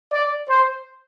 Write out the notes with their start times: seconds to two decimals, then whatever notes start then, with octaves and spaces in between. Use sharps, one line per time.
0.12 D5
0.49 C5